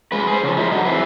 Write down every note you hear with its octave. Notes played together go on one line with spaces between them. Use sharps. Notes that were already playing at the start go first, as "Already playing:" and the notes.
G#3 B4
G#4 C5
C#3 F3
G#3 C#4 D#4 E4
D3 F#3 D#4
C4 E4 G#4 B4